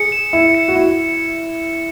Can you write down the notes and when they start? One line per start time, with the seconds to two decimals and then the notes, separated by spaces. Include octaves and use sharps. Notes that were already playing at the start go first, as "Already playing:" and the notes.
Already playing: G#4 C#7
0.12 E7
0.33 E4 E7
0.54 C#7
0.68 F#4
0.75 E4 E7